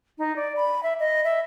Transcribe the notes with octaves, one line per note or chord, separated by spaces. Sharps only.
D#4
D5
B5
E5
D#5
E5